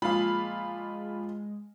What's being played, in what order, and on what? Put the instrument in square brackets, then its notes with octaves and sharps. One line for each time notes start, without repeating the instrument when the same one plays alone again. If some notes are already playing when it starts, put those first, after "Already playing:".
[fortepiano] A#2 F3 F5 [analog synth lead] G#3 [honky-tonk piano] F4 B5